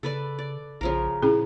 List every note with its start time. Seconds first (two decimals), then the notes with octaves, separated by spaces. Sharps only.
0.03 C#3 A4 B4 D5
0.39 D5
0.81 A#1 C#3 F3 A#4
1.23 A#2 C#4 E4 G#4